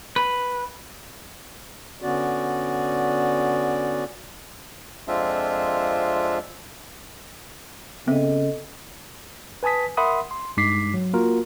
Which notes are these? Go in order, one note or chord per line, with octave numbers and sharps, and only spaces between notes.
B4
D3 B3 C#4 F#4 D5
F2 G#3 C4 D4 F4 E5
C#3 B3 C4 A4 D#5 E5
B4 G#5 A5 D#6 B6
A#4 E5 F#5 B5 C6 D#6
C6
G2 G#3 D#4 D6 B6 C7
F#3
A#3 F4 F#4 A#4